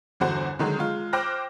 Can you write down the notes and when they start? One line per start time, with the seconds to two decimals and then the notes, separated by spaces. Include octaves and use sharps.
0.20 G1 E2 D3 F#4 C5
0.59 D3 D#3 F#3 G#3
0.78 G#3 F4
1.13 C5 G5 D6 F6 F#6 A#6